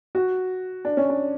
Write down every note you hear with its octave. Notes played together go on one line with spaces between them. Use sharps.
F#4
D4
C#4
D4